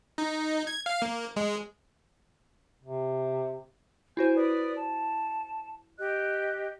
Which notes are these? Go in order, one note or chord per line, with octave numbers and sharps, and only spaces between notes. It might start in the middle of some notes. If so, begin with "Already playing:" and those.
D#4
G#6
F5
A#3
G#3
C3
E4 F#4 C5 G#5 G6
B4 D5 D#6
A5
G4 D#5 F#6